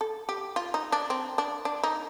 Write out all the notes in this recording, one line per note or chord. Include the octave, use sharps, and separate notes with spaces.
A4
G4
F4
D#4
D4
C4
D4
D4
D#4